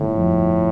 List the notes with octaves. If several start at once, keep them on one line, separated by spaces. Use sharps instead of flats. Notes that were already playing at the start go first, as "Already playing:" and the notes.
Already playing: G1 A2
F2